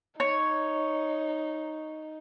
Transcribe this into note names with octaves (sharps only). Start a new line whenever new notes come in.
D#4 C#5